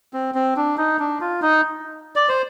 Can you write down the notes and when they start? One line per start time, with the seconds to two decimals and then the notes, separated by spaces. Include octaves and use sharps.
0.13 C4
0.35 C4
0.56 D4
0.78 D#4
0.99 D4
1.21 F4
1.42 D#4
2.16 D5
2.29 C5